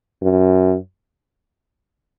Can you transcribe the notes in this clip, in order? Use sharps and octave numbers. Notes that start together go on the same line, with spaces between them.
F#2